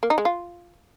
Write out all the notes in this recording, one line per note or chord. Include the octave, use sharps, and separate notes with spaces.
A#3
D#4
G#3
F4